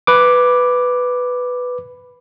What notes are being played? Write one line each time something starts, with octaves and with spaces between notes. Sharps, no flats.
B4 D6